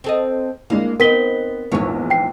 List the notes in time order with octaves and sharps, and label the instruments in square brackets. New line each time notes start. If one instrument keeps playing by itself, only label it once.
[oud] C4 A4 D#5
[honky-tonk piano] G#3 D4 E4 [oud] A#3
[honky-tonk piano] B3 [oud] C4 D#4 [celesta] A#4 B6 G7
[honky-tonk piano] A#1 E2 G#2 [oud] E3 C#5
[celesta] G5 C7